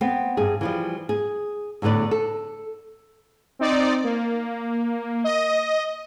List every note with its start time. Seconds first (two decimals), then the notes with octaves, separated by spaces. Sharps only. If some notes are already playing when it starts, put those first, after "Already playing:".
0.01 B3 C4
0.37 G2 G#4
0.61 E3 F3 G3
1.09 G#4
1.82 E2 A2 D3 B4 D5
2.11 A4
3.59 C4 D#4 D5
4.04 A#3
5.24 D#5